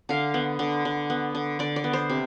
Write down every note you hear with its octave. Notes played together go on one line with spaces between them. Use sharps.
D3 F5
B3
D3
D3
B3
D3
D3 D5
D5
B3
C5
C3